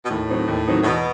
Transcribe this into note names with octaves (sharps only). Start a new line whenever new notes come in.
B2
D#2 A2
D#3 F#3 C4 D#4
D#2
D#3 F#3 C4 D#4
A2
E2 B2